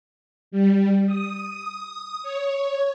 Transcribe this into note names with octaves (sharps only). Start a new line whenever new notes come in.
G3
D#6
C#5